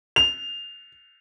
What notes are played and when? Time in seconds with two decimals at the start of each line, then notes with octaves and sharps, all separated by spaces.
0.16 F7